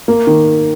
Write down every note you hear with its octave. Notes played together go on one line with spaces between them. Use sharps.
A#3
D#3